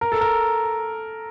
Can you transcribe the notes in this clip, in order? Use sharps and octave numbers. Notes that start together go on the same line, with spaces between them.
A#4
A4
A#4